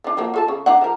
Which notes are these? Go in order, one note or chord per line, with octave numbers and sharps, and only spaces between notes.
F3 D4
F3 F#3 A#3
F4 A4 A5
C#3
D4 D#4 F#5
F3 A#4